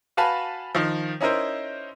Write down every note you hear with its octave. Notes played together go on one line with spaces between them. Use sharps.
F#4 B4 F5 G#5 A5 B5
D#3 F3
C#4 D#4 E4 A#4 C5